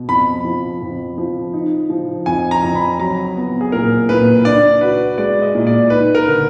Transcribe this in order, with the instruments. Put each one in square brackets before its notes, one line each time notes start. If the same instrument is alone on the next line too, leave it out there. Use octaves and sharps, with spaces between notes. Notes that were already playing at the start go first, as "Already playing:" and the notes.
Already playing: [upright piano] B2
[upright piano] F2 [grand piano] B5
[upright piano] F3
F2
F3
D#4
F3
[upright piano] F2 [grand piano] G#5
[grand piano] A#5
[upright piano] F2
[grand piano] B5
[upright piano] F#3 [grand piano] A#5
[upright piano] B3
[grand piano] G#4
[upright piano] A#2 [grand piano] A#4
[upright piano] A#2 [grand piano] B4
[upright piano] D4 [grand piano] D5
[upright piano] F#4 [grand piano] B4
[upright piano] G#3 [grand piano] D5
[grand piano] D#5
[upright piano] A#2
[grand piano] D5
[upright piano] D#4 [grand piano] B4
[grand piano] A#4
[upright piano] D3